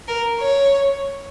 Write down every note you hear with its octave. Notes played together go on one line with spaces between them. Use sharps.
A#4
C#5